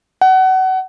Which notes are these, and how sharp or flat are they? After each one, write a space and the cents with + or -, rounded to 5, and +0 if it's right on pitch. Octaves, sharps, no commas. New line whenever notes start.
F#5 +25